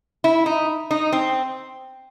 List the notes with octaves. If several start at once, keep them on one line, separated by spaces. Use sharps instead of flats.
E4
D#4
D#4
C4